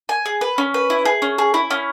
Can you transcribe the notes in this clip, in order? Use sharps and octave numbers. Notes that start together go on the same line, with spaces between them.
G#5
G#4
B4
C#4
B4
E4
G#4
C#4
G#4
E4
C#4